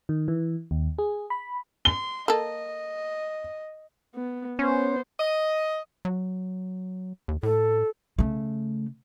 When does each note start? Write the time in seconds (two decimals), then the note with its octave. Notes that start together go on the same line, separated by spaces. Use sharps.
0.09 D#3
0.28 E3
0.71 D#2
0.98 G#4
1.30 B5
1.85 C6 G7
2.28 A#3 A4 D#5
4.15 B3
4.59 B3 C#4 C5
5.20 D#5
6.05 F#3
7.28 D#2
7.43 A2 A4
8.19 C#3 A3